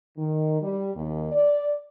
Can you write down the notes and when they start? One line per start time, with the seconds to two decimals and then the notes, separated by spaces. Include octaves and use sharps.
0.17 D#3
0.62 G3
0.95 D#2
1.32 D5